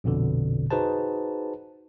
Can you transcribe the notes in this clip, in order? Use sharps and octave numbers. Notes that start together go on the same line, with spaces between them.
A#1 F2 B2 D3
D#4 F#4 G#4 B4 C5 A5